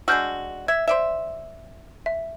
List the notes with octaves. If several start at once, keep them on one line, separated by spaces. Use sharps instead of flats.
G#3 D4 F#4 E6 F6 G6
E5 G#6
C5 D5 E5
E5